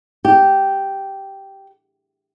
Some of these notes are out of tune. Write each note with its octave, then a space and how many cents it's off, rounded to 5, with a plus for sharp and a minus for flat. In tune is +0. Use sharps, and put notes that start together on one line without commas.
G4 -5